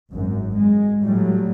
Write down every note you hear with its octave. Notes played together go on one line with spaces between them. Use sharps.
G#1 F#2
G#3
A2 F#3 G3 A3